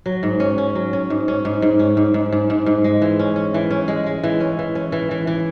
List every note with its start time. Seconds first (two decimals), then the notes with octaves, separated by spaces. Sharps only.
0.06 F#3
0.23 G#2
0.40 C#4
0.58 C#4
0.75 F#3
0.93 C#4
1.10 G#2
1.28 C#4
1.45 G#2
1.62 G#2
1.79 C#4
1.97 G#2
2.14 G#2
2.32 G#2
2.50 G#2
2.66 G#2
2.84 G#3
3.02 E3
3.19 C#4
3.36 C#4
3.54 E3
3.71 C#4
3.88 G#3
4.06 G#3
4.24 E3
4.40 C#4
4.59 E3
4.75 C#4
4.92 E3
5.11 E3
5.27 E3